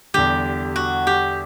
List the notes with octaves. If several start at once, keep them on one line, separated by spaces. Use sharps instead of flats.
E2 D3 G3 G4
F#4
G4